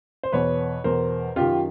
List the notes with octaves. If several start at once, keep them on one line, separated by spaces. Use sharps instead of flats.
C5
E2 B2 B4 C#5
E2 B2 A#4 C5
F#2 D#3 F4 G4